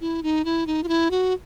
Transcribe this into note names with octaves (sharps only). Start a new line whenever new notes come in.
E4
D#4
E4
D#4
F4
E4
F#4